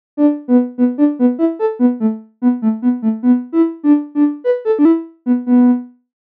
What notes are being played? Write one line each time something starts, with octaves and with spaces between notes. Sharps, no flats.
D4
B3
B3
D4
B3
E4
A4
B3
A3
B3
A3
B3
A3
B3
E4
D4
D4
B4
A4
D4
E4
B3
B3